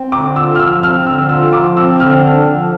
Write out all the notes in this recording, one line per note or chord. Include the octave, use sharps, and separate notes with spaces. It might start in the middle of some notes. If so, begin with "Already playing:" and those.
Already playing: C4
D3 D6
F4 E6
F6
F3 E6
C4 F6
D3 E6
F4 E6
F3 D6
C4 E6
D3 F6
D4
F3